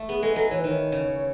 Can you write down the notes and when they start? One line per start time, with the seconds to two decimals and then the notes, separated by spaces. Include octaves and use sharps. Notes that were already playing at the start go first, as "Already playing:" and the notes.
Already playing: A3
0.09 B3 G#4
0.23 G#3 A4
0.36 F#3 A4
0.50 E3 C#5
0.59 B4
0.64 D#3 C#5
0.92 C#3